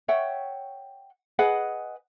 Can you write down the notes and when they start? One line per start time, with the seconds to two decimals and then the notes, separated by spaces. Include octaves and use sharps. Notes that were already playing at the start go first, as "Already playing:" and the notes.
0.08 C#5 E5 F#5 G5
1.39 G#4 B4 D#5 F#5